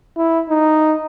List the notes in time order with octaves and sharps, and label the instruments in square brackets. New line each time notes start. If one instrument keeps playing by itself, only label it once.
[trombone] E4
D#4